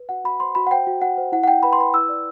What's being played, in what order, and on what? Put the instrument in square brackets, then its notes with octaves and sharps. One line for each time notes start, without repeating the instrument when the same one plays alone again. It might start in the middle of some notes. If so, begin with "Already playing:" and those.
Already playing: [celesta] B4
F#4 F#5
F#4 B5
C5 C6
F#4 B5
F#5
C5 G5
F#4
F#4 F#5
C5
E4 F#5
F#5
E4 G5
B4 B5
C6
B4 B5
E4 E6
D5